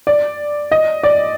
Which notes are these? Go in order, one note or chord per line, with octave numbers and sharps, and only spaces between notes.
D5
D#5
D5